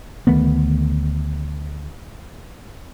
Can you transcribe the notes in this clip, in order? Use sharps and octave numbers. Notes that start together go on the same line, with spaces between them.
D2 D#3 A3 B3